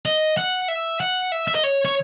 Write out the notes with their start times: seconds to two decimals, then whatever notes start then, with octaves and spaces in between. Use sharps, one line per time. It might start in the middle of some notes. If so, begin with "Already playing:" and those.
0.06 D#5
0.37 F#5
0.68 E5
1.00 F#5
1.32 E5
1.47 E5
1.55 D#5
1.64 C#5
1.85 C#5